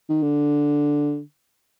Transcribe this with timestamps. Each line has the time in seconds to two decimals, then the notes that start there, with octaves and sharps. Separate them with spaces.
0.09 D#3
0.22 D3